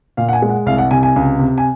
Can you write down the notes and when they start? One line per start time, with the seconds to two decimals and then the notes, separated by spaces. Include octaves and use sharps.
0.17 A#2 F5
0.29 F#5
0.33 G#5
0.42 G#3
0.50 F#5
0.66 C2 F5
0.78 F#5
0.91 C3 G#5
1.03 G#5
1.16 C#2
1.39 C3
1.58 G#5